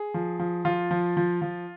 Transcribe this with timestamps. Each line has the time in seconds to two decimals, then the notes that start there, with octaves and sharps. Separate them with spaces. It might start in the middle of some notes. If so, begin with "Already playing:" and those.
Already playing: G#4
0.14 F3
0.39 F3
0.65 F3 F4
0.91 F3
1.17 F3
1.42 F3